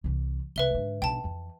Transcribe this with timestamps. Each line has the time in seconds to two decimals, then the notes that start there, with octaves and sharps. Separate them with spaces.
0.04 C2 E3
0.56 C2 B4 E5 G7
0.70 G#2 D3
1.02 B1 G2 G5 A5
1.24 F2 E3